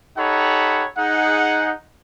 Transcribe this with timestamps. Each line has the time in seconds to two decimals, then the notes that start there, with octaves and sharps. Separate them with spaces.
0.18 D#4 G4 A4 C#5 F#5 B5
0.97 D#4 G#4 F#5